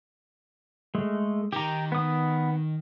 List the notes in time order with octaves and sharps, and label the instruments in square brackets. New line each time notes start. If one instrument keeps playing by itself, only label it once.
[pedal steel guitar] G#3 A3
[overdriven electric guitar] D#3 [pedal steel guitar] G4 A#5
[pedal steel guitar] B3 D#6